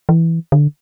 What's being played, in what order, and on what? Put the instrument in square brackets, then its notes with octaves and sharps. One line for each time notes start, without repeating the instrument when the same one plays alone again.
[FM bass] E3
D3